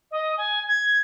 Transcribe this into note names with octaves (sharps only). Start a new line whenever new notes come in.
D#5
G#5
G#6